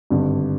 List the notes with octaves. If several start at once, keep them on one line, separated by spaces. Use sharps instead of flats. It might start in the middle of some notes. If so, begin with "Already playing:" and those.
G#1 G2 D3